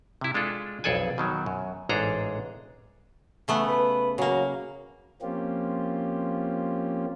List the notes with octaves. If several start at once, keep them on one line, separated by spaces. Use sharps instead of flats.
C3 E4
G#3 D4 F4 A4
B1 F2 G#4 A4 D5 G#5
B2 D#3 F#3
F#2
A1 G#2 D4 G#4 A4 A#5
C#3 A3 B3
B4
C#3 F#3 A#3
F3 A#3 C4 C#4 F4 G4